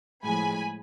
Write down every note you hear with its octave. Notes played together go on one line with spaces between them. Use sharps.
A2 F3 G#3 G#5 B5